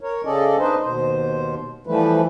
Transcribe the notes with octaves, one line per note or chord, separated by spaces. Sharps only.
A#4 C#5
C#3 C#4 A4 D5 D#5
D4 D#4 B4 C5 D#5
D#2 B2 C5
E3 F3 G3 A3 B4